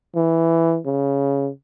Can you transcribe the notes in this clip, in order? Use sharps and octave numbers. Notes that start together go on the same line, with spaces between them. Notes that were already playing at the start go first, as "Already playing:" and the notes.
E3
C#3